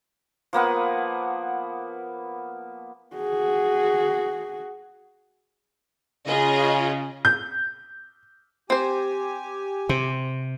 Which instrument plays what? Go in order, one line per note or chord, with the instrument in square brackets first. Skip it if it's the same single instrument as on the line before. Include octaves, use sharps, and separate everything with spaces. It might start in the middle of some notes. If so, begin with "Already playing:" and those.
[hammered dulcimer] F3 A#3 B3 F#5
[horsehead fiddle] F#4 G#4
[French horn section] C#3 [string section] F4 G#4 D#5
[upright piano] G6
[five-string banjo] C4 C5 [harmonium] G4 G#5
[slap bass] C3 [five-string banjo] C4